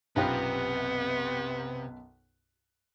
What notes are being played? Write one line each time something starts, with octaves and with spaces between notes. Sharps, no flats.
B1 F#2 C3 B3 D#4 F4 G4 B4